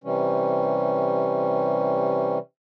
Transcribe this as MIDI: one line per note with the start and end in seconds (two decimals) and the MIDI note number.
0.04 2.38 48
0.04 2.38 52
0.04 2.38 55
0.04 2.38 61